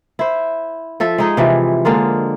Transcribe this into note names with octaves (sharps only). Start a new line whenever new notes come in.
E4 C5
F3 A4 E5
G#3 D#4 G#4
C3 E3 F3
D3 G#3 A#3 F4